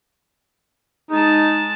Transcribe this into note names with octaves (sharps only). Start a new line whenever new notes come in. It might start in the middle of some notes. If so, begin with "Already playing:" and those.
G#3 D#4 A5